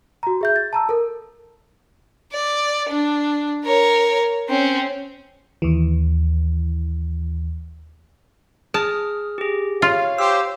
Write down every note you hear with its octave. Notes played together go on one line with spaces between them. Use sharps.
F#4 A#5
G#4 E5 G6
A6
A5 A#5 E6
A4 A#4
D5
D4
A#4 C#5
C4 C#4
D#2 E3
G#4 A5 D#6 F6
G4 G#4
F4 C#5 F5
G4 C5 E6